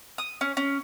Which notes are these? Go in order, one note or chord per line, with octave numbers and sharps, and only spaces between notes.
D#6
C#4
C#4